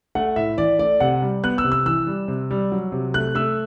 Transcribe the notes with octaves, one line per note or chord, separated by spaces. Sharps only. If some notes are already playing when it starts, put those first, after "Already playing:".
A3 F#5
A2 E5
E3 D5
A3 D5
C3 F#5
G3
B3 F#6
E6
C3
E6
E3 E6
G3
C3
G3
F#3
C3
A3 F#6
A3 E6